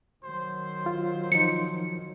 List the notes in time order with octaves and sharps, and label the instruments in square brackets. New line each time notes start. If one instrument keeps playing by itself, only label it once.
[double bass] D#3 F#3 [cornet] C5
[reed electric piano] F4
[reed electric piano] F3 D#4 [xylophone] C#7